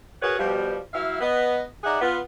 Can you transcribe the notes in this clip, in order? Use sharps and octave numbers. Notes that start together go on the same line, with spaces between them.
F#4 G#4 A#4 B4 C#5 F#5
B2 F3 G3
F#3 E4 E5 F5
B3 D#5
D#4 G#4 D5 E5 F#5
B3 F4